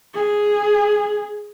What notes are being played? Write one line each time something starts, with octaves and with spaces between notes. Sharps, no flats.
G#4